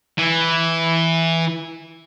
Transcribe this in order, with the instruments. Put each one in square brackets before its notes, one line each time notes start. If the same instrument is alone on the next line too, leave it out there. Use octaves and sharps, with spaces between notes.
[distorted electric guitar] E3